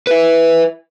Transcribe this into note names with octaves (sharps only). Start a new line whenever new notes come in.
B4 E5